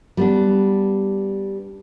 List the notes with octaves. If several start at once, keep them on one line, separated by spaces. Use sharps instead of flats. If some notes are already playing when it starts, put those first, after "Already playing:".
G3 B3 D4